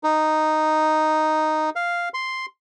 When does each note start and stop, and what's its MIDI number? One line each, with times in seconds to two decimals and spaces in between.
0.04 1.70 63
1.76 2.09 77
2.14 2.46 84